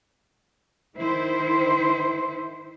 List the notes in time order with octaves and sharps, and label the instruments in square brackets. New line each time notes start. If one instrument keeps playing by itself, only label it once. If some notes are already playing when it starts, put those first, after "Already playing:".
[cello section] D#3 E4 C5